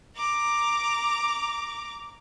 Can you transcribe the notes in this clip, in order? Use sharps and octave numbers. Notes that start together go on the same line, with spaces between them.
A#5 D6